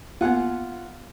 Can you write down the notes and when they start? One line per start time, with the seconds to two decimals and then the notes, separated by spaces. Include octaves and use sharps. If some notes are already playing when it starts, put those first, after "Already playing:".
0.21 A#3 B3 F4 F#5